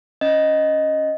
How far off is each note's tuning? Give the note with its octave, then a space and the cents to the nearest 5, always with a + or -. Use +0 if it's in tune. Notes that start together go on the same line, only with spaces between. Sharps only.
C#4 +0 D#5 +0